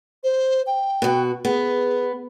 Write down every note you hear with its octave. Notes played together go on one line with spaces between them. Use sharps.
C5
G5
B2 F#4
B3 G#4